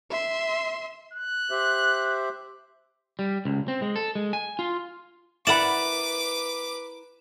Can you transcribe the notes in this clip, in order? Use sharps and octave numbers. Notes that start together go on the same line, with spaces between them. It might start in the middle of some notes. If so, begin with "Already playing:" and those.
E5 C6
F#6
G4 C5 E5
G3
C#2
C4
G#3
A4
G#3
G#5
F4
E4 A#4 B4 D5 F#5 B5 D6 E7